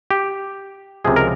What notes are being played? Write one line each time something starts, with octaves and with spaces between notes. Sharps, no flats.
G4
C#2 C3 F3 G#3 G#4
A#4